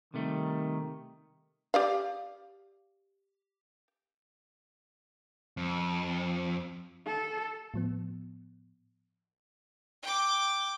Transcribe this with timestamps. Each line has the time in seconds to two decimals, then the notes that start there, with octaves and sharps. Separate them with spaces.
0.14 C3 D#3 G3 A3
1.74 G4 D5 F5
5.57 F2
7.07 A4
7.74 A2 F3 B3
10.03 G5 D6